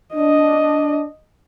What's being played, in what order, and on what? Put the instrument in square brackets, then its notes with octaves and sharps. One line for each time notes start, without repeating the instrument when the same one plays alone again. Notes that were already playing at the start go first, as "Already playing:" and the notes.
[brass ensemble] D4 [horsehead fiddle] D#5